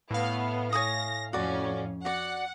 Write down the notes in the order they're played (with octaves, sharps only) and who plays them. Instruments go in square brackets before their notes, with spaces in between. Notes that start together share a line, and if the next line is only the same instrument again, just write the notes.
[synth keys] A2 F5 [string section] B3
[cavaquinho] C#5 G#5 D#6 [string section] A#6
[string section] F2 C#4 [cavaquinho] F#4 D5
[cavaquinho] F#4 D5 [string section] F#5